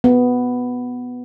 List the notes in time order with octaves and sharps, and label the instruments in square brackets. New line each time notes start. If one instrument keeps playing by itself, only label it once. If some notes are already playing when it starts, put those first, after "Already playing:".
[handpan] B3